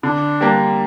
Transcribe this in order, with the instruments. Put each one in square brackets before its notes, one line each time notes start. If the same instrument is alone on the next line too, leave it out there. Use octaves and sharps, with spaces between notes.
[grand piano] D3 [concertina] D4
[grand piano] G3 A#3